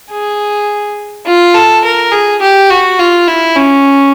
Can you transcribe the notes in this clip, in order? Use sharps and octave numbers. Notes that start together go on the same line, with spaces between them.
G#4
F4
A4
A#4
G#4
G4
F#4
F4
E4
C#4